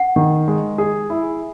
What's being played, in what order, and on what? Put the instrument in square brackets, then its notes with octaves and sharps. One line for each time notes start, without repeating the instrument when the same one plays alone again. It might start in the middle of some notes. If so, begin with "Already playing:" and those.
Already playing: [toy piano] F#5
[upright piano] D#3
G#3
G#4
E4